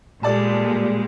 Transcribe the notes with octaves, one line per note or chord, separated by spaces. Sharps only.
A#2 G3 G#3 A4 D5 A5